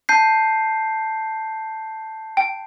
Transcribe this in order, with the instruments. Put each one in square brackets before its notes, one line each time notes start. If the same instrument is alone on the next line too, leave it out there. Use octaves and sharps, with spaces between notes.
[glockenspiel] A5 G6 C7
[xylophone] G5